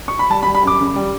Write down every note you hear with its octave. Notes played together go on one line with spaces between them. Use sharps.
C#6
B5
G3 A5
B5
G3
B5
F#2 D6
C#3
G3